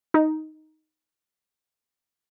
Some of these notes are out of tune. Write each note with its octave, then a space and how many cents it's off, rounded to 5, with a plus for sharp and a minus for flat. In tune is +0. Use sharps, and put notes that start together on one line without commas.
D#4 +0